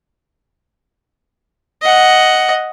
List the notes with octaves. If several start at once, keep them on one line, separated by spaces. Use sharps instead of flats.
D#5 F#5